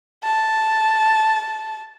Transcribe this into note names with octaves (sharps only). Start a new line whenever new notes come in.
A5